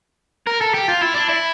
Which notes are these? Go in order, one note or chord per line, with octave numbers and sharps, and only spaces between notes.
A#4
A4
G4
F4
E4
D4
E4